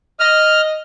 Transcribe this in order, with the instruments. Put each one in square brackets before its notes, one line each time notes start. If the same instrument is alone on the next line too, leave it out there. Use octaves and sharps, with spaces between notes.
[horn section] D#5 [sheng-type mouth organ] F6